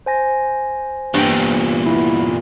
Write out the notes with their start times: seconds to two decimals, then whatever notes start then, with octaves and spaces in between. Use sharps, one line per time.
0.06 C5 G#5 A#6
1.14 E2 G2 A#2 G5
1.86 B3 E4